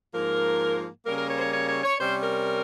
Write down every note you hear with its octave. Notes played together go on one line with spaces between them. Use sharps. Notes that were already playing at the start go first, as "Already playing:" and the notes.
G#2 F3 A#3 A#4
C#3 G3 A#3 A#4
A#4
C#5
C5
C#5
C#5
C#5
C#5
C3 G3 C#4 C5
A#4